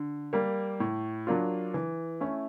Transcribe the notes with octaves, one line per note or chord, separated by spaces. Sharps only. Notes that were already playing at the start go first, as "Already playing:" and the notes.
Already playing: D3
G3 A#3
A2
F#3 A#3 D4 F4
E3
A3 C#4 E4